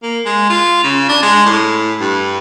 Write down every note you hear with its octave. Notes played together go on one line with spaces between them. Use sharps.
A#3
G#3
F4
C#3
D4
G#3
A2
G2